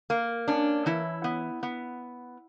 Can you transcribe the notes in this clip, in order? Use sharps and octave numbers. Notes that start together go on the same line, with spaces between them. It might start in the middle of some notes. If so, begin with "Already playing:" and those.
A#3
C#4 D4
E3 E4
B3
B3